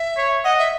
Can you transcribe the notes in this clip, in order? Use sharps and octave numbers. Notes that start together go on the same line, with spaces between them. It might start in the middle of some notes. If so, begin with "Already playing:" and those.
Already playing: E5
C#5
D#5 F#5
E5